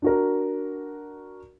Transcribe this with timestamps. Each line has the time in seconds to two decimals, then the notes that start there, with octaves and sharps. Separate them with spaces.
0.02 D4 F#4 A#4